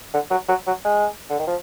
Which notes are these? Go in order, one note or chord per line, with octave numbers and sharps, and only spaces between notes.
D3
F#3
F#3
F#3
G#3
D3
D#3
F3